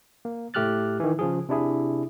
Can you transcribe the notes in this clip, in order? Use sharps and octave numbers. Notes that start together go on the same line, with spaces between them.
A#3
A2 A3 G4 F6 F#6 A6
D#3 E3
C#3 F3 G#4
C3 D4 E4 G#4